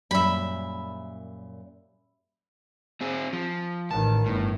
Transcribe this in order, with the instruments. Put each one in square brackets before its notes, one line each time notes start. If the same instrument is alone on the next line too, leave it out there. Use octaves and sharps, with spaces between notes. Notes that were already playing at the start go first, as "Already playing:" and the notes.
[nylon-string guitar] F#2 A#2 G3 [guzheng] E5 B5
[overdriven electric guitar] C4 G#4
F3
[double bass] A1 D#3 [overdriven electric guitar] A5
[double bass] G1 [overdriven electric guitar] A2